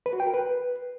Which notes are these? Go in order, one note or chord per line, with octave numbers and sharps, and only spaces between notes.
B4
F#4
G5
A#4
B4